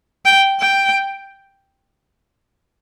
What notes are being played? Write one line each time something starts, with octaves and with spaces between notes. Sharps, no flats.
G5
G5